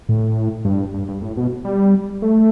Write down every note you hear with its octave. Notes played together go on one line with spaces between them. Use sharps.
A2
G2
G2
G2
A2
B2
G3
A3